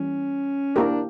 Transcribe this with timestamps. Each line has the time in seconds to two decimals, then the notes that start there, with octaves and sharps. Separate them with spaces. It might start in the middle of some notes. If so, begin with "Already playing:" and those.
Already playing: E3 G3 A#3 C#4
0.76 A#3 D4 E4 G4 A#4